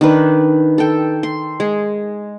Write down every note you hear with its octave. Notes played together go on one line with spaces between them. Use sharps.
D#3 D4 B4
A4 G5
C6
G#3